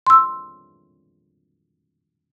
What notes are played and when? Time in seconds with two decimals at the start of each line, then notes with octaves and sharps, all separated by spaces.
0.07 C6 E6